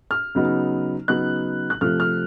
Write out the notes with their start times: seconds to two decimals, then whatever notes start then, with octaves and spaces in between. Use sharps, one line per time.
0.11 F6
0.35 C#3 F#3 B3 D#4
1.08 C#3 F#3 B3 D#4 F#6
1.70 F#6
1.81 C3 F3 A3 F6
2.00 F6